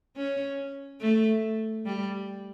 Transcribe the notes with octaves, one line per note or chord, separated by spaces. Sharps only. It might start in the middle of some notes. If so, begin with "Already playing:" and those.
C#4
A3
G3